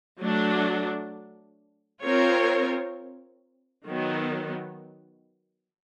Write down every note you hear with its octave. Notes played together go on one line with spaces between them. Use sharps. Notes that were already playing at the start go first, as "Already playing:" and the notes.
F#3 A3 D4
C4 F4 A#4 C#5
D#3 F#3 B3